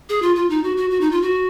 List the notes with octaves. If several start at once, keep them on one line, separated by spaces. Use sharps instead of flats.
G#4
F4
F4
D#4
F#4
F#4
F#4
D#4
F4
F#4